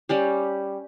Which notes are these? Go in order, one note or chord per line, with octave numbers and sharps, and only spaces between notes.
G3 C#4 G4